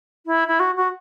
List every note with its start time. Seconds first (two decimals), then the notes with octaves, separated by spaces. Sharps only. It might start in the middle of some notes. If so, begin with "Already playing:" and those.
0.26 E4
0.47 E4
0.59 F#4
0.76 F#4